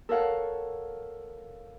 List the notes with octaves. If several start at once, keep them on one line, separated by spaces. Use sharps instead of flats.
A4 A#4 C#5 F5 F#5